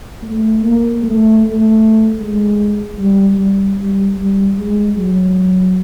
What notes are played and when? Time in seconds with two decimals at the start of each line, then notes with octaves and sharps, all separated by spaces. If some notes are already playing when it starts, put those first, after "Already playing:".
0.22 A3
0.62 A#3
1.02 A3
1.42 A3
2.20 G#3
2.99 G3
3.38 G3
3.77 G3
4.17 G3
4.56 G#3
4.96 F#3